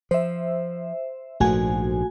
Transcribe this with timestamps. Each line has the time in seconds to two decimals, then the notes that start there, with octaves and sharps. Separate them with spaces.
0.11 F3 C5 E5
1.40 A#1 G#2 F3 A3 F#4 G#5